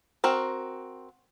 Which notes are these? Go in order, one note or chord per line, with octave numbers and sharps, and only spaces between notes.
C4 F#4 A#4